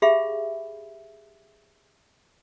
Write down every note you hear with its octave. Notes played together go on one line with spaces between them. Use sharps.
G4 G#4 E5 F5 B5